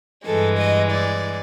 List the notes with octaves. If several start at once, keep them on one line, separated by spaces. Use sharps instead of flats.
G2 E3 G#3 A4
D#5
D5